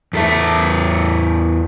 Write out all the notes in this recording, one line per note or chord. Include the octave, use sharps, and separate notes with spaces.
E2 A4 E5